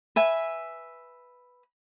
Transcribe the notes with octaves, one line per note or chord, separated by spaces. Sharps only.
B4 E5 G#5